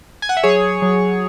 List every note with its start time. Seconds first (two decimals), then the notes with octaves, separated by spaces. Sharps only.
0.22 G#5
0.29 F#5
0.37 E5
0.43 F#3 G#4 C#5
0.82 F#3